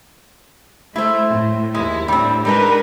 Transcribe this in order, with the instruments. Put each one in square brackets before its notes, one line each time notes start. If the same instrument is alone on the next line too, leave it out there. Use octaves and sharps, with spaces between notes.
[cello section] A3 [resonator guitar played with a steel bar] E4 C5
[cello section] A2
[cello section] D#2 E4 [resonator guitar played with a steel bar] G#3
[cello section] A2 D4 [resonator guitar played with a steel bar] G3 C4
[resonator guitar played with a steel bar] G3 D4 D#4 [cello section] G#3 A#4 B4